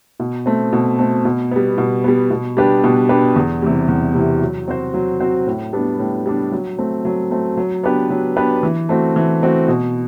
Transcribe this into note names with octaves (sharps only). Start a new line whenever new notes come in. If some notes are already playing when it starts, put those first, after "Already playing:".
B2
A3 C4
B2
A3 C4
B2
G3 B3
B2
G3 B3
B2
G3 D4 G4 B4
B2
G3 D4 G4 B4
E2
C3 E3 G3
E2
C3 E3 G3
F#3
C4 F#4 C5
F#3
C4 F#4 C5
A2
G3 B3 D4
A2
G3 B3 D4
F#3
A3 C4
F#3
A3 C4
F#3
B3 D4 G4 B4
F#3
B3 D4 G4 B4
E3
A3 C4 F#4
E3
A3 C4 F#4
B2